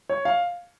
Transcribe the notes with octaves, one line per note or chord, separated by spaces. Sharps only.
C#5
F5